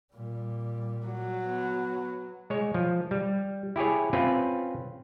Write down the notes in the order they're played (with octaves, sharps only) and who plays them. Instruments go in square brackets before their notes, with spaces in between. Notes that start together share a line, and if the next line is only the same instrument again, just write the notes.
[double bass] A#2 G3
[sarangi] F#3
[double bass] B3
[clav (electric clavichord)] G#3 C#5
F3
G3
E4 G4 G#4 C#5
C4 C#4 F4 B4